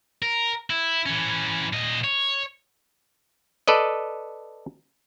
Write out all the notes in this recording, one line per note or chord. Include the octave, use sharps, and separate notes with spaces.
A#4
E4
E3 C#4
A#2 D#5
C#5
A4 B4 D5 D#5